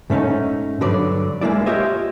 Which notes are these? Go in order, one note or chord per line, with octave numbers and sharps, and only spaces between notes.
G#2 A3 C#4 D#4
G2 D3 F#3 B4 D5
B1 G#3 A#3 E4 D5
F4 G4 C#5 D#5 E5